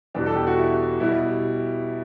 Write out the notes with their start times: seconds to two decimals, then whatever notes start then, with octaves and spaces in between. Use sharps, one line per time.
0.15 E2 B2 G3 D4
0.26 A4
0.36 G4
0.47 F#4
0.58 E4
1.00 B2 G3 E4